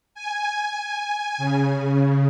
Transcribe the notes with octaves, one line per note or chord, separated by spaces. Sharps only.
G#5
C#3